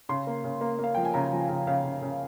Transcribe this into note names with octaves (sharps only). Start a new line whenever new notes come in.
C#3 C6
A#3
C#3
A#3
A#3 F5
F3 G5
G#5
C#3 A#5
F3
C#3
C#3 F5
C#3
C#3